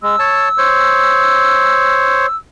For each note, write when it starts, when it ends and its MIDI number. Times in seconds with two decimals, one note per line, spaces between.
0.03 0.16 56
0.03 2.36 88
0.19 0.49 73
0.19 0.49 81
0.58 2.26 72
0.58 2.26 73